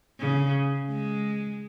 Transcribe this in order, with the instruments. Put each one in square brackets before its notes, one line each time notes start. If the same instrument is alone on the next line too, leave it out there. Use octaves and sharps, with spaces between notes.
[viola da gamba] C#3
G#3